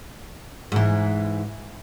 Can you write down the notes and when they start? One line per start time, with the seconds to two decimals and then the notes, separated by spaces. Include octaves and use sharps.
0.72 G#2 E3